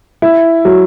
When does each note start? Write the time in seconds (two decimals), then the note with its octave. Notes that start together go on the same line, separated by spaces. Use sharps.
0.22 E4
0.65 F#3